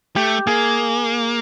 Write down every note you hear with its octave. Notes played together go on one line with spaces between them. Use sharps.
A3 G4
A#3 G#4